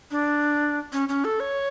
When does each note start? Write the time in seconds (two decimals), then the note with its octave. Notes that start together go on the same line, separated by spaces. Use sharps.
0.11 D4
0.93 C#4
1.09 C#4
1.24 A4
1.40 C#5